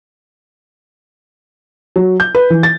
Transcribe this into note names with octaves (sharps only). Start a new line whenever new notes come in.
F#3
G6
B4
E3
A6